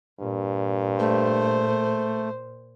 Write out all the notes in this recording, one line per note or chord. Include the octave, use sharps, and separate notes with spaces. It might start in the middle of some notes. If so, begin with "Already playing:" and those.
G2 A#2
A3 C5